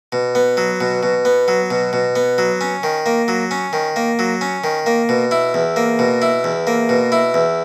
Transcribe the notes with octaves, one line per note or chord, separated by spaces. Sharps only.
B2
B3
F#3
B2
B2
B3
F#3
B2
B2
B3
F#3
C#4
D#3
A#3
F#3
C#4
D#3
A#3
F#3
C#4
D#3
A#3
B2
E4
E2
A#3
B2
E4
E2
A#3
B2
E4
E2